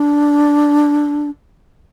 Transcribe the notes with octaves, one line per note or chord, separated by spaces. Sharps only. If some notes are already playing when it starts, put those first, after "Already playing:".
Already playing: D4